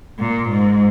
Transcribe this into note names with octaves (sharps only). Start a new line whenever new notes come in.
A#2
G#2